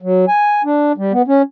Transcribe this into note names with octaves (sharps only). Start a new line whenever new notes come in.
F#3
G#5
D4
G3
B3
C#4